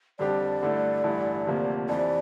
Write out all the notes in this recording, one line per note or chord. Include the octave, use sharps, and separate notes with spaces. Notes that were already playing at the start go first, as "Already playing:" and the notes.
F2 D3 G3 D4 G4 D5
G2 D3 A3 E4
A1 G2 D3 A3 E4
D2 C3 F3 A#3
F2 C3 E3 D5